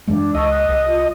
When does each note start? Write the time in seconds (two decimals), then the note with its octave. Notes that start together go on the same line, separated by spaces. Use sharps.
0.07 F#2 E3 G#3 D4
0.35 C#2 D#5 A5 C#6 E6
0.50 F#6
0.68 C2
0.86 F4